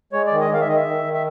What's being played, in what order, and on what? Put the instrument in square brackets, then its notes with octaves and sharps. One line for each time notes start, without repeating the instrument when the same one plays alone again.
[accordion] G#3 C#5
D5
D#3
D#5
D#3 F5
E5
D#3 D#5
E5
D#3
D#3
E5